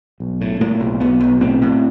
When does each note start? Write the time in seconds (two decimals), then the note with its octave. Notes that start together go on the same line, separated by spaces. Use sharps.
0.20 B1
0.41 A2
0.61 A2 A#3
0.80 B1
1.00 B1 B3
1.20 B1
1.41 A2 C4
1.61 A2